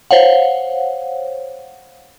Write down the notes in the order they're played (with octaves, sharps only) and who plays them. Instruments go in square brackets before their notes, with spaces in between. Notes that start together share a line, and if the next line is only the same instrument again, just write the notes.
[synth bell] C5 C#5 F5 F#5